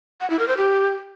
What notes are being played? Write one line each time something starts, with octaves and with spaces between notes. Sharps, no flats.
F#5
E4
A#4
C5
G4